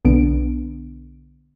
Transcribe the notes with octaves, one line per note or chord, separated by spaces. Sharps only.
B1 D3 B3 D4 D7